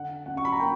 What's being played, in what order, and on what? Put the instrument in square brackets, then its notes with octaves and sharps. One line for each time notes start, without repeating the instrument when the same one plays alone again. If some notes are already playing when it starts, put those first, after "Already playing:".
Already playing: [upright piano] D3 F#5
C#4 F#5
C#6
B5
A#5
A#3 G5